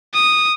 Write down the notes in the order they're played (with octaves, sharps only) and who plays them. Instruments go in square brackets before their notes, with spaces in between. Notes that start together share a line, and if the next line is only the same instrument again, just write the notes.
[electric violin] D#6